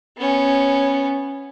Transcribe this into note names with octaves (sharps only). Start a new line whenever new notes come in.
B3 C#4